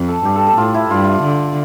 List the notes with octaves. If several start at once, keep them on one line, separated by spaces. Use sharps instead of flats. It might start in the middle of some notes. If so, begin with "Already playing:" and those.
Already playing: F2
A4
G2 G4
A4
A4
A2 F4
E4
G2 F4
D3